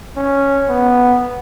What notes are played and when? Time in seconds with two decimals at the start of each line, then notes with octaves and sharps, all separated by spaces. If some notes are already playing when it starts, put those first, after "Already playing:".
0.16 C#4
0.68 B3